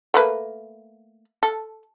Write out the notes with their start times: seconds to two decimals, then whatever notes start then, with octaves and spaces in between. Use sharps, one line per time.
0.14 A3 A#3 B4
1.43 A4